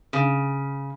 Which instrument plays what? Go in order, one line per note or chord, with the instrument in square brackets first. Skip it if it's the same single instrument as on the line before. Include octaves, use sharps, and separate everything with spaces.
[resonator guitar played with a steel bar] C#3